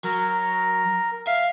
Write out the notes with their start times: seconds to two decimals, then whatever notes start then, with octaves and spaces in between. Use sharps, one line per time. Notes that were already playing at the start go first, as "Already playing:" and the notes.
0.04 F#3 A#4
1.27 E5 F5